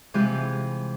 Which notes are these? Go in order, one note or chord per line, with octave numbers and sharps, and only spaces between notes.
C3 E3 G#3 F4 G4 B4